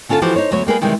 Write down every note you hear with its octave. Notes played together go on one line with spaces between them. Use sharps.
D3 C#4 F4 A4 A5
E3 F3 F#4 G4
D#4 C5 C#5
D2 F#3 B3 C#5
G3 A#3 G#4 B4
C3 D#3 E3 G3 G#3